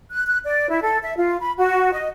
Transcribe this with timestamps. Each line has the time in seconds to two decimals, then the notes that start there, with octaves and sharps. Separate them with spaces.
0.11 F#6
0.26 F#6
0.44 D5
0.70 E4
0.82 A4
1.02 E5
1.16 F4
1.40 B5
1.58 F#4
1.92 D#5